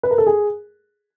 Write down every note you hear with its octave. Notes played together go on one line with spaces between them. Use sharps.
B4
A#4
A4
G#4